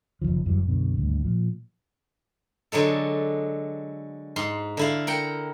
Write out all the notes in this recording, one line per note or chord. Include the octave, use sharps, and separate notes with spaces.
F#1 C#2 D#3 F3
G1 F#2 E3 G3
B1 F#2 B2 D3
G#1 D2 G2
A#2 F3
D3 F#3 G#3 A4
G#2 C6
D3 E4 F5
A#4 F#5 G5